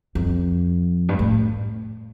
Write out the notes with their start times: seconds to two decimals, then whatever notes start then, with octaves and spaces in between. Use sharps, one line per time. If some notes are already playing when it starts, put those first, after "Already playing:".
0.15 F2
1.09 G2
1.19 A2